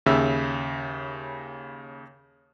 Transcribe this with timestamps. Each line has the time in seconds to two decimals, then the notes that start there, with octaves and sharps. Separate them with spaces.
0.06 D#2 C#3 E5 E6